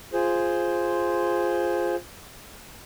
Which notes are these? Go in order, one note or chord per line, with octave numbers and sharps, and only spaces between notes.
F4 G#4 C5